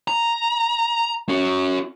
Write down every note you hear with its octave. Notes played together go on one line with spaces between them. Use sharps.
A#5
C#4 F#4